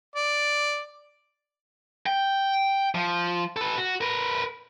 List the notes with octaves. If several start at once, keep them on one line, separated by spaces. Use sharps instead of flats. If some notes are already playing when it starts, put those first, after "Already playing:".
D5
G5
F3
A4 B4
F#4
A#4 B4